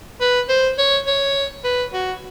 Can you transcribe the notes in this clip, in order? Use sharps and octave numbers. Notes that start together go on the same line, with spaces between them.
B4
C5
C#5
C#5
B4
F#4